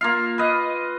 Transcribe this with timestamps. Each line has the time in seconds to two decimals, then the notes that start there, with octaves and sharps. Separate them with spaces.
0.01 A#3 F4 F5
0.38 B4 D#5